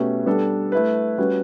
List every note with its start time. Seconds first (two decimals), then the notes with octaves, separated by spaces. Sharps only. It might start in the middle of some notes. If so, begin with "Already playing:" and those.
Already playing: B2 A3 C#4 G4 B4
0.26 G3 B3 D4 A4
0.72 A3 E4 B4
1.18 G3 C#4 F#4 B4